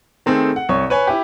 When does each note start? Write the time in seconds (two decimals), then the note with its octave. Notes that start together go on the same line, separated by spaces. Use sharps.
0.26 D#3 A3 C4 G#4 A4
0.56 F#5
0.69 C2 C#5 C#6
0.90 B4 C#5 G#5
1.07 E4 G4